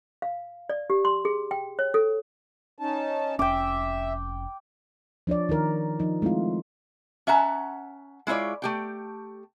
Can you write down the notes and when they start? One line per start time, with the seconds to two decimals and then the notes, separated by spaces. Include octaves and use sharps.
0.22 F5
0.69 D5
0.90 G4
1.05 C6
1.25 G#4
1.51 G5
1.79 C#5
1.94 A4
2.79 C#4 D#4 A5
3.39 F1 C#4 E5 G5 D6
5.27 F3 D4 C#5 D5
5.49 D#3 D#4 A#4
6.00 F3 D#4
6.22 G#3 A3 C4 E4 F4
7.27 C#4 E5 F#5 A5 A#5
8.27 G#3 E4 F4 C#5 D5
8.62 A3 G4 G5